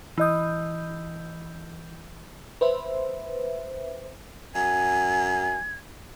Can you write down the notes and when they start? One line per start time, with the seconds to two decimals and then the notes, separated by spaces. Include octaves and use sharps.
0.18 E3 E4 D#5 D#6 G6
2.61 B4 C5 E5
4.55 F#2 G#5 G#6